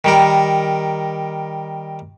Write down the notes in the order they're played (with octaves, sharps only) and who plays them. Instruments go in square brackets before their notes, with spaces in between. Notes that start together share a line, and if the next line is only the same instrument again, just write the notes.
[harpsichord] D#3 G3 A#4